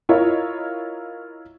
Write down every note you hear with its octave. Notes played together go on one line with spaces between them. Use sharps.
E4 F4 A#4 C#5 D#5